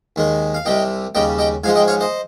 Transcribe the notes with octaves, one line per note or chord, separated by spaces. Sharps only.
D#2 D#3 G#3
F5
C2 C3 G3 D#5 G5
D#2 C#3 G3 D#5 G5
D#5 G5
G#2 F3 G#3 F5 G#5
D#5 G5
C#5 F5
C5 D#5